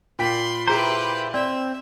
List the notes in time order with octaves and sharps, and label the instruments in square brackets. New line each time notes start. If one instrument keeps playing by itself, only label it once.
[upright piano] A#2 G5 B6 [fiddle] B5 C6
[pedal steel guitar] E4 C5 [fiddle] G4 B4 [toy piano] G#4 A#5
[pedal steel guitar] C4 [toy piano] D5 [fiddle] E5